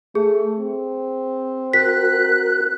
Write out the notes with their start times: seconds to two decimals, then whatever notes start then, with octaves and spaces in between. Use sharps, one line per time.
0.15 A3 G#4
0.58 C4
1.73 F#4 A#4 F#6 B6